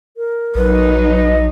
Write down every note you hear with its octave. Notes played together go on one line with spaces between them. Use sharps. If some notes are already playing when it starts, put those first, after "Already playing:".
A#4
A#1 F#3 D#4 B4
D#5